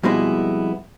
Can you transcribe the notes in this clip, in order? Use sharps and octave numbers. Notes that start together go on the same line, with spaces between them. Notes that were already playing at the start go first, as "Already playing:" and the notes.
F2 B2 G3 G#3 B3 E4